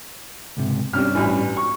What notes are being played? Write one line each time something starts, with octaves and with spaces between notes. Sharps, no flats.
C#2 G#2 C3
G2 C3 C#4 D4 F6
A1 E3
C#6